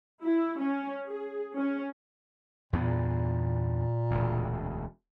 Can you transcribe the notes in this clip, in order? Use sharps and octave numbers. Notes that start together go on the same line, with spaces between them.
E4
C#4
G#4
C#4
E2 G2 A#2 B3
E1 D2